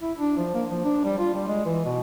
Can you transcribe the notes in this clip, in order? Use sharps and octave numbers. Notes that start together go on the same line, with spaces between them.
E4
D4
F3
A#3
F3
D4
G3
F4
G3
G#3
E3
B2